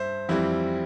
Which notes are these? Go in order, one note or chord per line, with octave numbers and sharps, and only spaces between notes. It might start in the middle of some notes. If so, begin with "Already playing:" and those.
Already playing: G2 C5 E5
F2 E3 G3 C4 E4